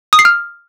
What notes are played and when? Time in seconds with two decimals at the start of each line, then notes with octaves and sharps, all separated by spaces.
0.13 D#6
0.19 C7
0.25 F6